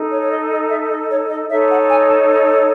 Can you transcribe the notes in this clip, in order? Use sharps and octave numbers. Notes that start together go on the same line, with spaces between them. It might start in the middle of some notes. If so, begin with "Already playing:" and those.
Already playing: D#4 A4
C#5
C#5
D#5
D#5
E5
D#5
C#5
D#5
D#4 A4 C#5 E5
F#5
G#5
A5